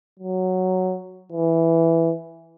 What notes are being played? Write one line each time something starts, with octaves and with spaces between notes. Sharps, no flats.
F#3
E3